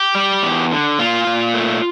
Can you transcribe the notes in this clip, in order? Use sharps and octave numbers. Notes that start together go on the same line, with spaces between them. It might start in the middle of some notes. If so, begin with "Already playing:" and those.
Already playing: G4
G3
E2
D3
A#2 F4
A#2
A3